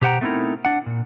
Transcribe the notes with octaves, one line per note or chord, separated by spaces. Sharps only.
B2 G4 C5 F#5 G5 A#5
A3 B3 C4 D#4 E4 A#4
D4 F#5
A#2